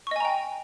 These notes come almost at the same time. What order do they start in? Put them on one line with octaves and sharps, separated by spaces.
C#6 D#5 G#5 A#5 G5